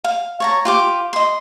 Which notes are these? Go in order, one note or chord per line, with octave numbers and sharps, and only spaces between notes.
F5
C#5 A5 A#5
F4 G4 D6
D#5 C6